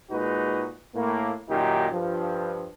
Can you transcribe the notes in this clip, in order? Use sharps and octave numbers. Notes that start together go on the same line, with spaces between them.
A#2 G#3 D#4 F#4 B4
A2 A#3
F#2 A#2 D#3 D#4 G4
G2 F3